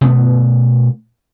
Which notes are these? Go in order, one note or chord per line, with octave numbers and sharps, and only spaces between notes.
B2 A3 B3